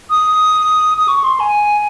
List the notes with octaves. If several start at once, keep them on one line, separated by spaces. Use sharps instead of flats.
D#6
D#6
C#6
C6
G#5